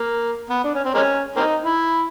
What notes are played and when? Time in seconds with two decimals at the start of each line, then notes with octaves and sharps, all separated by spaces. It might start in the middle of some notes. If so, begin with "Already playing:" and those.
Already playing: A#3
0.50 B3
0.64 D4
0.75 C#4
0.85 C4
0.94 G#3 A#3 C#4
1.36 A#3 C4 D#4
1.65 E4